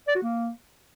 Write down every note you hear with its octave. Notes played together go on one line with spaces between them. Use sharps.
D5
F#4
A#3